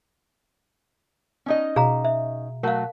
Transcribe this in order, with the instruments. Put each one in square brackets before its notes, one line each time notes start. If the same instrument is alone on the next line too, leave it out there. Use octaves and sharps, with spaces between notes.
[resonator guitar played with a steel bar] C#4 D#4 D#5
[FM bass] B2 [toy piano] G#4 F5 A#5
[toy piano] E5
[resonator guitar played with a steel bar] F#3 A3 F#4 [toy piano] A#4 F5